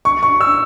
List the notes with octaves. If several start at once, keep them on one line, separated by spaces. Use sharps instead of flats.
C#6
C#6
E6